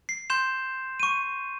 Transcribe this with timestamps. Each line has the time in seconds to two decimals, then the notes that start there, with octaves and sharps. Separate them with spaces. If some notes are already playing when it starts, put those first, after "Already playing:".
0.09 C7
0.30 C6 G6 E7
1.00 C#6 D#7